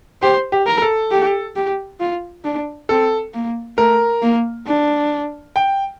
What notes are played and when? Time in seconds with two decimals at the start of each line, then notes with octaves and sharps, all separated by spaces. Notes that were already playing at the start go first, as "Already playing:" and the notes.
0.22 G4 C5
0.52 G4
0.66 A#4
0.82 A4
1.12 G4
1.56 G4
2.00 F4
2.44 D4
2.89 C4 A4
3.34 A#3
3.78 A3 A#4
4.22 A#3
4.67 D4
5.56 G5